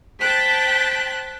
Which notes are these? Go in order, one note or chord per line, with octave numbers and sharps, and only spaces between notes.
C5 G5 A5 F#6 B6